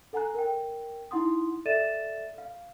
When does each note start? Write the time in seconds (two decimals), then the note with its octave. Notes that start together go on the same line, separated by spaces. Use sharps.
0.13 A4 F#5 G#5 A#5 F#6
0.34 A#4 G5
1.11 D#4 E4 F#5 C6 D#6
1.65 A4 D5 E5 A6 D#7 E7
2.38 F5